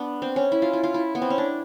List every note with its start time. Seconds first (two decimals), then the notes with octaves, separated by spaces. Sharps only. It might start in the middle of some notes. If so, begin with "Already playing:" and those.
Already playing: B3 D4
0.22 C4
0.36 C#4
0.52 E4
0.62 F4
0.73 E4
0.84 F4
0.94 E4
1.15 B3
1.22 C4
1.30 C#4
1.38 D4